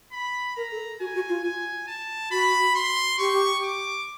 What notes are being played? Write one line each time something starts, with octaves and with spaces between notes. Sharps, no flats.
B5
A#4 A#5
A4
F#4 G#5
F#4
F4
G#5
A5
F#4 B5
C6
G4 C#6
D6